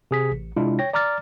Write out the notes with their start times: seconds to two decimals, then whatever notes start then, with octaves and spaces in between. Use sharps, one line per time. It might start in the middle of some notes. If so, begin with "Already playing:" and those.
0.11 C3 G#4 B6
0.31 A1
0.56 C3 G#3 D4 E4 F4
0.79 C#5 G5 A#6
0.93 D5 A#5 D6 F6 A6